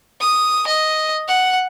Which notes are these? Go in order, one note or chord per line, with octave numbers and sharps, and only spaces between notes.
D#6
D#5
F#5